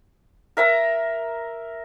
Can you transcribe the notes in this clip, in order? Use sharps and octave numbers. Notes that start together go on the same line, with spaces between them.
A#4 E5 A#5